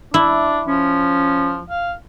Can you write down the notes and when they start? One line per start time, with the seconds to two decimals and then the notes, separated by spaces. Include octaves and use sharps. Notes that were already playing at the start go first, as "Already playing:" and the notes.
0.14 D4 E4
0.67 F3 C#4
1.70 F5